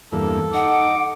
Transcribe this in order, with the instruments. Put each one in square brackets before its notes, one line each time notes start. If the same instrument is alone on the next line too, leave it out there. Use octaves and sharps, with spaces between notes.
[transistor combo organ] E2 G2 A#3 [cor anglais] A4
[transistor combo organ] D#4 [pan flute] F#5 [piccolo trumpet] D6